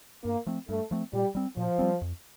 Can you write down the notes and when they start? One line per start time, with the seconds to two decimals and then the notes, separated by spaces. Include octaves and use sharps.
0.24 G2 A#3
0.46 F3 A3 C4
0.69 G2 A3
0.91 F3 A3 C4
1.13 A#2 G3
1.35 G3 C4
1.57 A#2 F3
1.79 G3 C4
2.02 F2